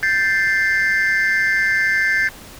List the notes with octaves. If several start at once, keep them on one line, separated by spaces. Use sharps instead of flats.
G6 A6 C7